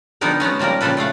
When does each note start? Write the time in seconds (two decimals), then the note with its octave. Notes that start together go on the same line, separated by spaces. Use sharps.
0.21 D3 F3 G3 B3 D#4 A#4
0.40 F#3 G#3 B3 C#4
0.59 C#3 F3 G3 A#3 A#4
0.81 A#2 C#3 F3 G3 A4 B4
0.97 C#3 A3 F5 F#5